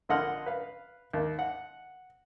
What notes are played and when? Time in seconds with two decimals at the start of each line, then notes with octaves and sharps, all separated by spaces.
0.09 A#1 D3 D#5 F#5 C6 F6
0.46 B4 F5
1.13 D#2
1.39 F#5